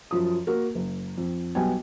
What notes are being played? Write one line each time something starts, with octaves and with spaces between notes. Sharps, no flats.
F#2 F3 D#6
A#3 F#4 A#4
F#1
F2
B1 G3 B3 G5 G#5